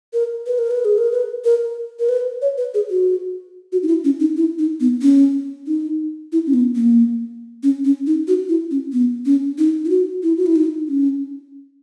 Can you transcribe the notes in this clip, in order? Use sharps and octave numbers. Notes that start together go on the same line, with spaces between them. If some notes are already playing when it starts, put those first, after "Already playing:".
A#4
B4
A#4
B4
G#4
A#4
B4
A#4
A#4
B4
C#5
B4
G#4
F#4
F#4
D#4
E4
C#4
D#4
E4
D#4
B3
C#4
D#4
E4
C#4
B3
A#3
C#4
C#4
D#4
F#4
E4
C#4
B3
C#4
D#4
E4
F#4
E4
F#4
E4
D#4
C#4